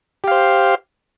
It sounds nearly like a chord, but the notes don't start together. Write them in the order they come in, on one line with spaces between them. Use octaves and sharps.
G4 F5 C5